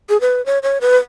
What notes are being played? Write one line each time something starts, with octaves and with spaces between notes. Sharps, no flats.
G#4
B4
C#5
C#5
B4